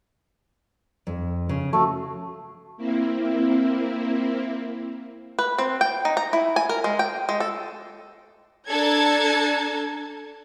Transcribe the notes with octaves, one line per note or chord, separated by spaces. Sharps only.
F2
C#3
F3 A3 F#4
A#3 C4 E4
B4
C4
G5
D#4
A#5
E4
G#5
A#4
G#3
G5
G#3
A4
D4 A4 A5 A#5 G#6